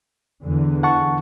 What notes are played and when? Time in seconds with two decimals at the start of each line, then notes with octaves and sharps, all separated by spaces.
0.42 E2 D3 E3
0.83 F#5 A5 C#6